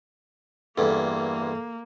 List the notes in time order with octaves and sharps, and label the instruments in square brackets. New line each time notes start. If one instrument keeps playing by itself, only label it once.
[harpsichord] E2 G2 [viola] A#3 [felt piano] A4